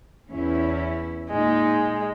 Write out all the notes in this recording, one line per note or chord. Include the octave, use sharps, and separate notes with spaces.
E2 C#4 E4
A#2 G#3 D#4